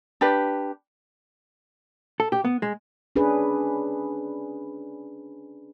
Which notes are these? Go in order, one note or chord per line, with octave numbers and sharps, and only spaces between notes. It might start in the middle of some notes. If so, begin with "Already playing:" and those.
D4 G4 B4
A4
G4
B3
G#3
C#4 D4 G#4 B4